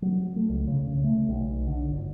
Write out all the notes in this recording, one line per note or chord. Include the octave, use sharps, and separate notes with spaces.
F#3
A3
C#2
C#3
C#3
A3
B1
D3
G1